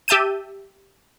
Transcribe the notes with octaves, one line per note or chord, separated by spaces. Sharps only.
G4 E5 A5 G6 D#7